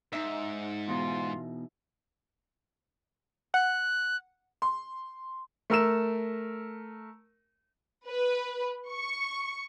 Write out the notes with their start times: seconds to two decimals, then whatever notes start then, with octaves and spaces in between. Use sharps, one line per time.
0.13 G#2 D#4 E5
0.88 E2 B2 F4
3.54 F#5 F#6
4.62 C6
5.70 A3 A#4 E6 E7
8.08 B4
8.88 C#6